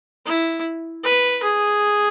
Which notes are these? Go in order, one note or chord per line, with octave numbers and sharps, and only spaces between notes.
E4
B4
G#4